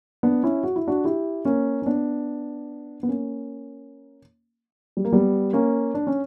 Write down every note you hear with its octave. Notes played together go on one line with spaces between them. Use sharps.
B3 D4
C#4 E4
F#4
E4
D4 F#4
E4 G4
A#3 C#4
C#4
B3 D4
B3
A#3 C#4
G3
A#3
G3 B3
A#3 C#4
D4
C#4